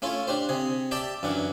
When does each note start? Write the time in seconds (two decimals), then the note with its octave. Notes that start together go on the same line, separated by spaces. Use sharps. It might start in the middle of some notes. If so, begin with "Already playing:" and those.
0.02 A3 C#4 E4 F4
0.27 D4 G4 C5
0.49 C3 G#4
0.91 G4 D5 E5 G5 A5
1.23 F#2 E3 F#3 D4